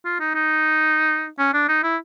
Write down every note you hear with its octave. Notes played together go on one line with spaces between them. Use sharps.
F4
D#4
D#4
C#4
D4
D#4
E4